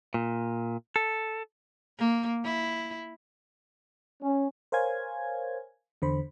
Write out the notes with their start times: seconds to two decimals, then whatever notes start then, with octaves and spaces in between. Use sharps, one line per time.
0.14 A#2
0.96 A4
1.99 A#3
2.45 E4
4.23 C#4
4.72 A#4 C5 C#5 F5 G#5 G#6
6.02 E2 D3 C5 B5